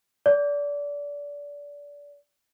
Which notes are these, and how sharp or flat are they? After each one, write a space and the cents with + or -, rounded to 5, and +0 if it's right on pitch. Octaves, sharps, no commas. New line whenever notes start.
D5 -25